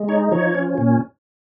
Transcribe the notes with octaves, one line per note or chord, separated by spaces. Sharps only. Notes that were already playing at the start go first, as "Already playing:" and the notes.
Already playing: G#3
D#4 C#5
F3 C#5
C#4
A#2